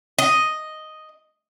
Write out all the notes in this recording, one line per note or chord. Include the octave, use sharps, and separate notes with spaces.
D#5